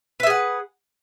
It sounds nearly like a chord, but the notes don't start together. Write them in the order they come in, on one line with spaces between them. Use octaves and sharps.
B4 E5 G#4 F#5